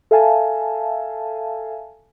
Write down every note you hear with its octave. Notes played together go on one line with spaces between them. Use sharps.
A4 E5 F5 G#5 A5